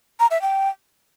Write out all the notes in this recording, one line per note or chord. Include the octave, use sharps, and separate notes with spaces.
A#5
E5
G5